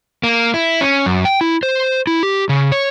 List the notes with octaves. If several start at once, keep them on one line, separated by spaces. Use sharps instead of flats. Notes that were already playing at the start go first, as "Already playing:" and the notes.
A#3
E4
C#4
F#2
G5
E4
C5
E4
G4
C#3
C#5